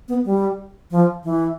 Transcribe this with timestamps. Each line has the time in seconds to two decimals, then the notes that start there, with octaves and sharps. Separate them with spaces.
0.08 B3
0.25 G3
0.91 F3
1.24 E3